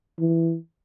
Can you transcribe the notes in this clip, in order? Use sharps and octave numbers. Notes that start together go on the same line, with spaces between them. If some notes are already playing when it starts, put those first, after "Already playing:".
E3